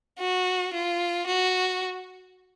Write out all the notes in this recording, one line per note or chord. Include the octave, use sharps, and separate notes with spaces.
F#4
F4
F#4